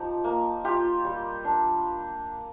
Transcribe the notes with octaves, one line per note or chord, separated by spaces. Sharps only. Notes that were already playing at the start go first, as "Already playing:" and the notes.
Already playing: F3 D#4 G4
A#3
F4 G4
G3
D4